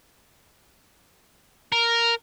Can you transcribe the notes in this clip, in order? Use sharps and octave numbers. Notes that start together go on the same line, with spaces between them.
A#4